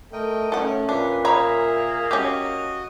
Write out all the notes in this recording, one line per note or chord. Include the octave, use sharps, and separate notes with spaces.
A3 A#4 D#5 G5
A3 C#4 A4 F#5
A#2 D4 B4
A#3 G#4 C#5 E5 A#5 B5
C#4 F#4 G4 D#5